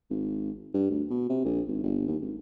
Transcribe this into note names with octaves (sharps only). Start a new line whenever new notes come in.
G#1
G2
D2
B2
C3
A#1
G#1
G1
D#2
G#1